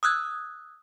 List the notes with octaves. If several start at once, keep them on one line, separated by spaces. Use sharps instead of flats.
D#6 E6 F#6 G#6